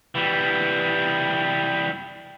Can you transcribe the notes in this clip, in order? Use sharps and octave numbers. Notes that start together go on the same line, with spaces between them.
E3 G3